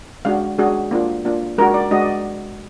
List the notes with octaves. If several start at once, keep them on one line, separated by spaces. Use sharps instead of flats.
G#3 D4 F#4 F5
G#3 D4 F#4 G#4
A#3 D4 F4
A#3 D4 F4
G#3 D4 F#4 A#4
D5
G#3 D4 F#4 D#5
D5